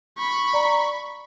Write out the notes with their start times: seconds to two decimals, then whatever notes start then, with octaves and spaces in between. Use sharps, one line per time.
0.18 B5 C#6
0.53 D5 A#5